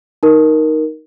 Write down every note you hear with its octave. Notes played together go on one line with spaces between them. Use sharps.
D#4 A#4